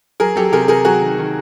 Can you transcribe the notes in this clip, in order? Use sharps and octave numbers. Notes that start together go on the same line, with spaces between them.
F#3 G#4 A#4
F#3 G4 A4
C3 G#4 A#4
C3 G#4 A#4
F#3 F#4 G#4
D#3
D#3